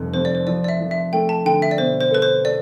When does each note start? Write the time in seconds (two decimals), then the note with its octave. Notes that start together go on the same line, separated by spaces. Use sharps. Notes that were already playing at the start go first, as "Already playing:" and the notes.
Already playing: F1 F2 G3
0.14 F2 C5
0.25 D5
0.35 C5
0.47 F3 D5
0.64 D5
0.68 E5
0.80 F3
0.91 E5
1.13 A3 G5
1.29 A5
1.45 D3 G5
1.62 E5
1.71 D5
1.78 B2 C5
2.01 C5
2.11 A4 B4
2.22 C5
2.45 A4 D5